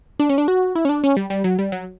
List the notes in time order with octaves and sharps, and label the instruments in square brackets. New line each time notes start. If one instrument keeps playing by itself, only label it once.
[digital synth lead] D4
C#4
D4
F#4
E4
C#4
D4
C#4
G3
G3
F#3
G3
F#3